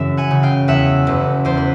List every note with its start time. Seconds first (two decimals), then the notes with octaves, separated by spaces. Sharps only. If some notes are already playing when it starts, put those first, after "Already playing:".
Already playing: F#2 C#3 E3 E5
0.17 F#5 G#5
0.31 C#3
0.43 F5 G5
0.68 E2 E5 F#5
1.07 F#1
1.45 E2 C5
1.57 B4